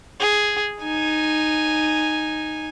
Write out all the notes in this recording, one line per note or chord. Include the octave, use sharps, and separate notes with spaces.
G#4
D#4 G#5